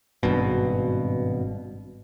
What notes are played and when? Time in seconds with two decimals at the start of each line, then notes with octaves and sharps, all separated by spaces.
0.23 G#1 G2 B2